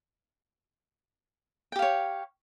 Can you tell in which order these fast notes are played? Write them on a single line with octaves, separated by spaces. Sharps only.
G5 G4 F5 C#5